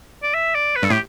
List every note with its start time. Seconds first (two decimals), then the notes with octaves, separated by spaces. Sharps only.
0.23 D5
0.34 E5
0.55 D5
0.76 B4
0.82 G2 A4
0.90 A2 G4